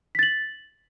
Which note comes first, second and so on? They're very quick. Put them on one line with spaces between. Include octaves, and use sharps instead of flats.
B6 A6 F#7